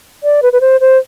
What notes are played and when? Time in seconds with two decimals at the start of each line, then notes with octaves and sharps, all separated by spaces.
0.23 D5
0.43 B4
0.53 B4
0.61 C5
0.81 C5